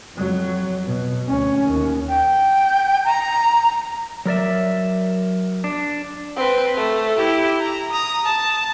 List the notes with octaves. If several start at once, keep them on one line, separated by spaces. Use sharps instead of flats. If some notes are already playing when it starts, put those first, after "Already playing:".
F2 F#3
B2
D2 C#4
D#2
G5
A#5
F#3 A#4 D5 E5
D4
C4 B4
A3
E4 G4
A#5
A#5 D#6
A5